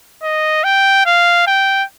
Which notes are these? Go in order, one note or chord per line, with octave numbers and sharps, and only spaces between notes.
D#5
G5
F5
G5